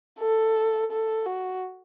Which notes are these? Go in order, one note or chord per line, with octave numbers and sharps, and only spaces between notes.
A4
A4
F#4